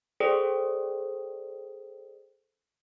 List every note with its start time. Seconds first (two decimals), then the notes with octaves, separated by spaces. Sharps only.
0.20 G#4 A4 C5 D5 G5 D#6